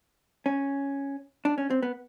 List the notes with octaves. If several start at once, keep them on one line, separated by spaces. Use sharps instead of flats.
C#4
D4
C#4
C4
B3